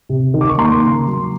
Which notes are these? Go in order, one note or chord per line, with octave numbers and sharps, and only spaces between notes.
C3
D#3
D6
C#6
A#3 A#5 C6
C#3
F#3